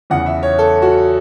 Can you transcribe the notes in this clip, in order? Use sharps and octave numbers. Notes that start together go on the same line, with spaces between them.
E2 C#3 E3 F#5
E5
C#5
A4
F#4